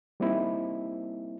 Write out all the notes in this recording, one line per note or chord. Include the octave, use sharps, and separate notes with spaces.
G3 A#3 C4 D#4 E4